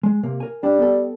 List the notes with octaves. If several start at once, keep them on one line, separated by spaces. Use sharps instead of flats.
G#3
C3 A#3
A#4 G#5
G3 D4
B3 A4